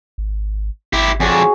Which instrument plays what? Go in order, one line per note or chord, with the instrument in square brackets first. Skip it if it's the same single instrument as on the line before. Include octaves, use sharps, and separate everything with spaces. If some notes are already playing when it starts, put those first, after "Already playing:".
[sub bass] G#1
[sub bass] G#1 [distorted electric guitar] E4 G4
[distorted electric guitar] F2 D4 [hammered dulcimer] F#4 G#4 C#5